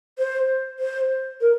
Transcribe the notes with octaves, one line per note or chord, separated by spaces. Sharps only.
C5
C5
A#4